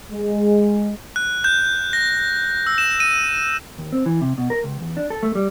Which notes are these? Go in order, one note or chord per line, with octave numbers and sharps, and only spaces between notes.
G#3
F#6
G6
A#6
E6
E7
D#7
D#2
C4
E3
C3
B2
A#4
C#2
E2
D4
A4
A3
G3